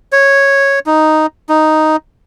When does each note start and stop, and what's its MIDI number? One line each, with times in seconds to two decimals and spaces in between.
0.12 0.79 73
0.86 1.26 63
1.49 1.96 63